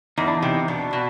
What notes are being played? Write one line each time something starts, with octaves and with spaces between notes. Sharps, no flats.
E2 D#4
D4
D#4
C3
B2 D4
B2